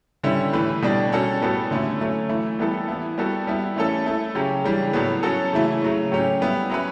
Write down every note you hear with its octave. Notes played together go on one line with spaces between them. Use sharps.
D3 G3 C#4 E4
A2 E3 A3 E4 B4
B2 G3 D4
G3 C#4 F#4 A4
A2 G3 B3 F#4 A4
D3 A3 C#4 E4
F#3 A3 C#4
E3 A3 E4
E3 G3 B3 E4 A4
E3 B3 E4
G3 B3 F#4 A4
G3 B3 E4
E3 A3 C#4 E4 A4
A3 E4 A4
C#3 F#3 C#4 G4
C#3 E3 G3 D4
A2 F#3 B3
F#3 C#4 F#4 A4
C#3 E3 A3 E4
C#3 F#3 A3
A2 F#3 C#4 G4
G3 B3 E4
F#3 C#4 E4 B4